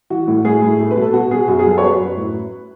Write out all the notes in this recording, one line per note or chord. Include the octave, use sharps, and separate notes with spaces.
E3 F#4
A2
A2 G#4
A2
A3
B4
B2
A4
B2 F#4
B2 G#4
F#2 F#4
G#4
F#3
A4
C#5
F#3 B4
F#2
A2